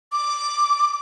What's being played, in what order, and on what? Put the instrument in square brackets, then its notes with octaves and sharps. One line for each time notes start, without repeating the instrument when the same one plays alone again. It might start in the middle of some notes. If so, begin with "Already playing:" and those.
[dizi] D6